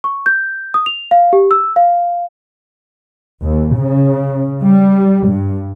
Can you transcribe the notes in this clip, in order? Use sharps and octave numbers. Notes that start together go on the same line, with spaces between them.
C#6
G6
D#6
F7
F5
G4
E6
F5
D#2
C#3
G3
G2